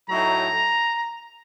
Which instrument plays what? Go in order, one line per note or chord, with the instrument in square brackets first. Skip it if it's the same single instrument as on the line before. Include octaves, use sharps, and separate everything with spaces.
[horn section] A2 F#3 A3 D#4 A#5